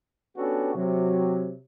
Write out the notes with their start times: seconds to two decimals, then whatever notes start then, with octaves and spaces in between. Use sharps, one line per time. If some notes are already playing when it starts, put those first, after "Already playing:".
0.36 B3 C#4 D4 F#4 G4 A4
0.74 C3 F#3